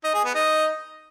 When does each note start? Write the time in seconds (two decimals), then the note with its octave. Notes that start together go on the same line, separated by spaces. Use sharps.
0.04 D#4
0.14 G#4
0.24 B3
0.35 D#4